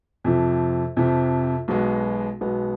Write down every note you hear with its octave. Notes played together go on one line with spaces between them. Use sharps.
F2 C3 F3
F2 C3 F3
B1 B2 G#3 B3
B1 B2 G#3 B3